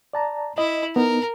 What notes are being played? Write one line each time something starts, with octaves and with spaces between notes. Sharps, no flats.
D5 A5 A#5
E4 D#5
B3 D#4 A#4